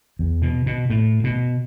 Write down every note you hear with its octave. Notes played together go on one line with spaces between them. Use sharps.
E2
B2
B2
A2
B2